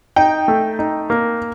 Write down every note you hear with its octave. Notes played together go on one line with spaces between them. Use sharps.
D#4 G5
A3
D#4
A#3